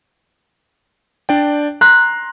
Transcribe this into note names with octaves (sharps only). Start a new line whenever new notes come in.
D4 D5 G5
A#5 C6 F#6